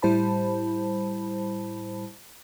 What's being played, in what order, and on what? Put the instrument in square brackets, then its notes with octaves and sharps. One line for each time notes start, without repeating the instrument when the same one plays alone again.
[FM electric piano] A2 G3 E4 C5 A5 B5